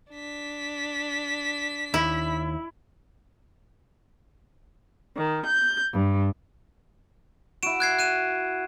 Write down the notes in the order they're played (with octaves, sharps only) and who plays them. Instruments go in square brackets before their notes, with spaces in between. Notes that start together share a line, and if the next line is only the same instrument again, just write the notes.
[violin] D4 B6
[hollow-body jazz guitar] D#2 [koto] E4
[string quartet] D#3
G6
G2
[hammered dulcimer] E4 F#4 [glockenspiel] D7 E7
[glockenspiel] F#6 G#6 C7
F#6 D#7 E7